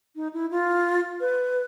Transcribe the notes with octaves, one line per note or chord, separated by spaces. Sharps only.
D#4
E4
F4
B4